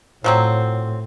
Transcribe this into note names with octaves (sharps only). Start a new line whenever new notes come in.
A2 F3 F#3 C4